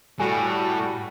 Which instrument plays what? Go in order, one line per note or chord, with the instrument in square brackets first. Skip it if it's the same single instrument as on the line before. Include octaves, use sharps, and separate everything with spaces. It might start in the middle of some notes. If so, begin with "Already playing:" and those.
[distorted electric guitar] A2 [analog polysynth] G3 F#4 [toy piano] G#5